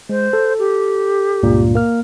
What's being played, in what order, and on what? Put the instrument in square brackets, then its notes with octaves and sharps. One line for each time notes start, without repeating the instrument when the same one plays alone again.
[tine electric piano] G#3 [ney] C5
[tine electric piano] A4
[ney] G4
[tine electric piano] C#2 G2 A#2
A#3 F6